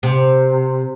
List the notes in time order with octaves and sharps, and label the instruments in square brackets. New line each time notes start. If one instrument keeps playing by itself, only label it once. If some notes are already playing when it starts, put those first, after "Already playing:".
[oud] C3